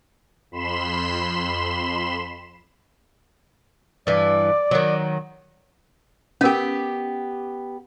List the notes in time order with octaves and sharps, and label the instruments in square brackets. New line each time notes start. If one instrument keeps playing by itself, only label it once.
[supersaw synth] F2 B5 C6 E7
[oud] G2 E3 [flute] D5
[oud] D#3 F#3
[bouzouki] B3 G4 [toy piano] C#4 A#4